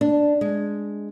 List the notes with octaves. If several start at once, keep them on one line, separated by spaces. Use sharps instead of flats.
D4
G#3